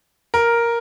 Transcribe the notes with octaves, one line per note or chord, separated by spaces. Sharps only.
A#4